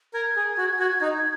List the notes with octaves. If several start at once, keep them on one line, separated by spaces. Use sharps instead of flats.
A#4 G#6
G#4
F#4
F#4
D#4